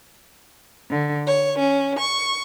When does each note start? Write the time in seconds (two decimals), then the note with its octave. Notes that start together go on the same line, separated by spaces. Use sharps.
0.89 D3
1.26 C#5
1.58 C#4
1.98 C#6